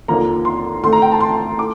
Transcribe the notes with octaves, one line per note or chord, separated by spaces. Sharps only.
D#2 D3 F3 A#3 A#5
C6
D2 D3 A3 C6
A#5
G5
A5
C6
A3 D6